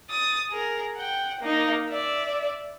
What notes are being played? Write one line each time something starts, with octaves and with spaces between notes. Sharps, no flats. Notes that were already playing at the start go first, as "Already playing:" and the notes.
D#6 A6
G#4 A#4
F#5 G5
A#3 D#4
D5 E5